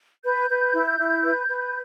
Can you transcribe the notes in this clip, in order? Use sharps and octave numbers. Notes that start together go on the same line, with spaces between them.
B4 G6
B4
E4
E4
B4
B4